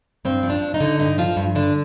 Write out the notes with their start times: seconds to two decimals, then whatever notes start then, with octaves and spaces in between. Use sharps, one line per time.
0.25 G2 C4
0.43 F3
0.50 D4
0.61 G2
0.74 D#4
0.81 D3
0.99 G2 D#4
1.18 F3 F4
1.37 G2
1.55 D3 D4